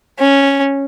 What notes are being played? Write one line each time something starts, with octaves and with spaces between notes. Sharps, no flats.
C#4